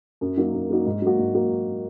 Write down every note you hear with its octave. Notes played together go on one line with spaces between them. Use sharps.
F#2
F#3 A#3 D#4 F#4
F#2
F#3 A#3 D#4 F#4
G#2
F#3 A#3 F#4
G#2
F#3 A#3 F#4